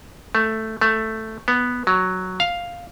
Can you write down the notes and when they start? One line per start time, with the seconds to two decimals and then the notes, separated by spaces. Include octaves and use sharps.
0.35 A3
0.81 A3
1.48 B3
1.87 F#3
2.40 F5